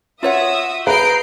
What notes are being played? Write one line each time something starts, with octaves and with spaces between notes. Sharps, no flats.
F4 F#4 C#5 E5 F#5 D#6
G#4 B4 A#5 G6 C7 D7